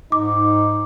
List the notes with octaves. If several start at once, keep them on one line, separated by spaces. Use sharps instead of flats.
G#2 D#4 D6